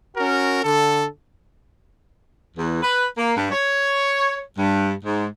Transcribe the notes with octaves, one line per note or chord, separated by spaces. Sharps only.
C#4 F#4 A#4
D3 A4
E2
B4
A#3
G2
C#5
G2
G#2